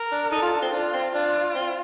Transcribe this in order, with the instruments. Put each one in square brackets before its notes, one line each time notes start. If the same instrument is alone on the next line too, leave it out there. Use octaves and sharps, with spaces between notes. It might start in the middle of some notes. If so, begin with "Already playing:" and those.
Already playing: [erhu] A#4
[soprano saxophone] D4
[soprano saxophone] D#4 [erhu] A4
[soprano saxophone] F4
D4
C4
[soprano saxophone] D4 [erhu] F4
[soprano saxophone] C4
[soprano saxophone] D4 [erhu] F4
[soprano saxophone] C4